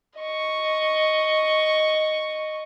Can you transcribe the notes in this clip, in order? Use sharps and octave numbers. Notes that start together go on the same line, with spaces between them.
D#5 C#6